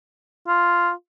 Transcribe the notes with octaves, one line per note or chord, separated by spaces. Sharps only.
F4